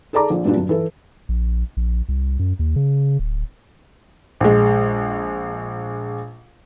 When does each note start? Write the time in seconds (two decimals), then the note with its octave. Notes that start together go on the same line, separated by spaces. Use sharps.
0.13 G#4 A4 D5 A5 A#5 D6
0.30 A#1
0.45 G2 A#2 F#3 D4
0.57 F#2
0.69 E3 A4
1.29 A#1
1.77 A#1
2.09 C2
2.39 F#2
2.59 D#2
2.76 C#3
3.19 D1
4.41 A#1 G#3